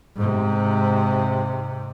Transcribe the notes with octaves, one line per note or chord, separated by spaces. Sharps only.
G#2 C3